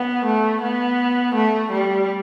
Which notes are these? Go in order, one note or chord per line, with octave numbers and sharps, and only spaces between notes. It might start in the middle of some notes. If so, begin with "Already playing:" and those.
Already playing: B3
A3
B3
A3
G3